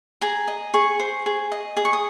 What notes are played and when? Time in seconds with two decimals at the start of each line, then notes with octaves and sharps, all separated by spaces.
0.21 G#4 A#5
0.48 D#5
0.74 G#4 C#6
1.00 C5
1.26 G#4
1.52 D#5
1.76 G#4 D#6
1.85 C#6
1.93 D#6